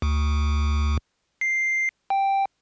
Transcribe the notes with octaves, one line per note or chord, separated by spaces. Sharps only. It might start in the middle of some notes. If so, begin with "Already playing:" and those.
D2
C7
G5